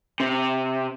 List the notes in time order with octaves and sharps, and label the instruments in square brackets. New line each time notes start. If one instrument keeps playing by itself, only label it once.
[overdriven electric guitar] C3